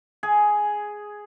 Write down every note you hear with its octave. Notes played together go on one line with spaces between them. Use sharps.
G#4